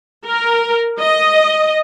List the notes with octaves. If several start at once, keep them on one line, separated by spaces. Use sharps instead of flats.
A#4
D#5